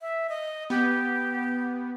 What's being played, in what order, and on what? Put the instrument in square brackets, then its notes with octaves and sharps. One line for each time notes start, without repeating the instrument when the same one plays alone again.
[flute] E5
D#5
[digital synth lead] B3 [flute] G4